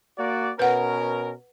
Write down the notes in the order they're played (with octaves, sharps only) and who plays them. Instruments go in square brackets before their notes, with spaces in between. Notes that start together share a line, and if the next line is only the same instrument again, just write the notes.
[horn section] A#3 F#4 D5
[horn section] B2 C#4 A#4 [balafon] B4 F#5